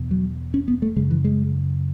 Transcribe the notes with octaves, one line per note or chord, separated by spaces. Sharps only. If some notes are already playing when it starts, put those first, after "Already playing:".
Already playing: E2 B2
F#3
C#4
B3
A3
F#2 C#3 G#3
E3
G#3